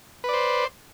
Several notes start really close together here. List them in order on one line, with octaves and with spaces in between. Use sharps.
B4 D5 C5